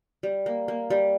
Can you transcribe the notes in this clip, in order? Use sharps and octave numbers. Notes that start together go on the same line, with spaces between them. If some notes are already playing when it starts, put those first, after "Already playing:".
G3
A#3
A#3
G3